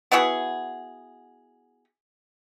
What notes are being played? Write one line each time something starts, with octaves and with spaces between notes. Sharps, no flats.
B3 E4 F#4 G#4